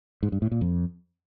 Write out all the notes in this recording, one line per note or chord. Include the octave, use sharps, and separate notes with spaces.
G#2
G2
A2
A#2
F2